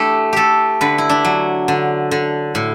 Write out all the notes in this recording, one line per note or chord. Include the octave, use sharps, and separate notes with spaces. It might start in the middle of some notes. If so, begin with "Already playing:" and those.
Already playing: A3 D4 E4 G4
A3 G4 A4
D3 B4
E4
D4
F#3
D3
D3
A2